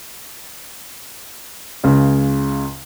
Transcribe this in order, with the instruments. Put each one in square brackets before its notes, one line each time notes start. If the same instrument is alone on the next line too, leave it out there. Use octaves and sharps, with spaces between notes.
[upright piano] C#2 C#3